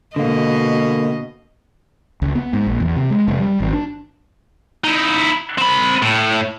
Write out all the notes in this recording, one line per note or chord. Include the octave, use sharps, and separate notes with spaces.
B2 D3 A#3 D#5
C#2
B3
G#2
A#1
E2
C3
G#3
F1
G3
G#1
D4
D#4 E4
C4 B5
A2